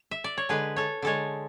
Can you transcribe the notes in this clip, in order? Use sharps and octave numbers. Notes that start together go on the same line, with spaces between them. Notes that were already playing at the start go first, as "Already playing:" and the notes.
Already playing: F#5
E5
D5
C#5
D3 G#3 G#4 B4
A4 C#5
D3 G#3 A4 C#5